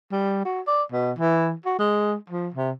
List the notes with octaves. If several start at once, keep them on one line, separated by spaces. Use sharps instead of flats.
G3
F#4
D5
B2
E3
F#4
G#3
F3
C3